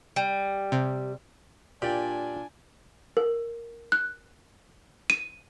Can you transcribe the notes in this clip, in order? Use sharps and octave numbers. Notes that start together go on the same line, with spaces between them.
G3
C3
A#2 D4 G4 D5 G5 G#5
A#4
F#6
D#7